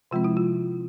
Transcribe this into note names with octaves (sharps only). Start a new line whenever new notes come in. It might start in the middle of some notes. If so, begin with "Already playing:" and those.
C3 F3 G#3 C4 F4
E4
F4